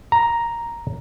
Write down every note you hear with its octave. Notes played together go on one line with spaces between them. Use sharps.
A#5